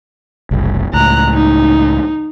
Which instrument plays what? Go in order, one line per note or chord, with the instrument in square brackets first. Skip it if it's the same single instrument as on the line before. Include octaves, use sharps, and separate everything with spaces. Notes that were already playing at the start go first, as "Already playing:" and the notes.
[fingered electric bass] F#1 C2
[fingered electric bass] C#2 A2 [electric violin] A#5 F#6
[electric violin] D#4